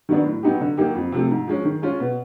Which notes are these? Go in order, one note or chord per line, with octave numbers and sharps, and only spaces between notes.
D#3 F#3 B3 D4
A2
F#3 B3 D#4 G4
D3
F#3 A#3 D#4 G4
F2
C3 F3 A3
G#2
F3 G#3 C#4
D#3
G#3 C#4 F4
B2